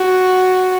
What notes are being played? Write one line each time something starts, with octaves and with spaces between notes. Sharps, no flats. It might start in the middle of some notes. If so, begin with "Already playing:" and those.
Already playing: F#4